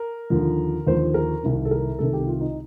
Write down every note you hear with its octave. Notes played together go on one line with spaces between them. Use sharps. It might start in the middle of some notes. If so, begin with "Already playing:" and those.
Already playing: A#4
D#2 D3 F3
D#2 D3 F3 C5
A#4
C2 C3 D#3
A4
A#4
C2 C3 D#3 A4
G4
F4
D#4